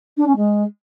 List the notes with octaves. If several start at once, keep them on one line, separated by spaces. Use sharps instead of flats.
D4
C#4
G#3